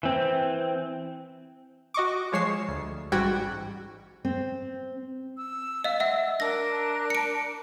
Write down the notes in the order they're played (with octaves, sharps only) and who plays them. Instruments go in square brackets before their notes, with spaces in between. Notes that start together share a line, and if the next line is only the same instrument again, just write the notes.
[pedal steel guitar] E3 C4
[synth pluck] F#4 D#5 C#6 D6
F3 G#3 C#5 C#6 C7 E7
D2
A1 G#2 G3 F#4 G5 G#6
[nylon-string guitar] C4
[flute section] E6
[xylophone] D#5 F5
E5 F#5
[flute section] D4 A#4 F#6 [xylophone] E6 A#6
[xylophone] C#7 D7